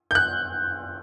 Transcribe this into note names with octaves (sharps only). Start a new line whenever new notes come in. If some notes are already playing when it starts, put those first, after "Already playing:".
G6
F#6